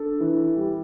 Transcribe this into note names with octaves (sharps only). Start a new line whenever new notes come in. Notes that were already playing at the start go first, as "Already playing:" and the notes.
Already playing: D4 A4
E3
G3